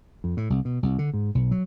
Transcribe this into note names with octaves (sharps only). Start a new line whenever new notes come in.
F2
A2
C2
B2
C2
D3
G#2
B1
F#3